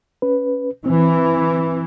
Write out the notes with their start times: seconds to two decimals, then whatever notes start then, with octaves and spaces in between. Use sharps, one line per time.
0.22 C#4 B4
0.86 E3 C4